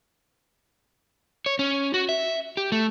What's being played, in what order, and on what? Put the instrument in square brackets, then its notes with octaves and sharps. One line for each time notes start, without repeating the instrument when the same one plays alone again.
[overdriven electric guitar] C#5
C#4
F#4
E5
G4
A3